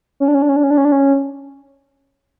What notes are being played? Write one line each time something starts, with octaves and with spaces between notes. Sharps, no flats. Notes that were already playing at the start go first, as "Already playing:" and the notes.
C#4
D4
C#4
D4
C#4
D4
C#4
D4
C#4
D4
C#4